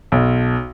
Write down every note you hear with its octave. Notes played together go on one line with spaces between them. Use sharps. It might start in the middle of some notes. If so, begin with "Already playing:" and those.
B1